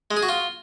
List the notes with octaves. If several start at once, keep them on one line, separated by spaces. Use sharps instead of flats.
G#3
G#4
F#4
F4